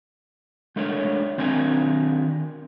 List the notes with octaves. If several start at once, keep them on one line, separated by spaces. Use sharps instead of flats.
G#3 A3 D4 A#4 C#5
D#3 C4 D4 A#4 G#5 A#5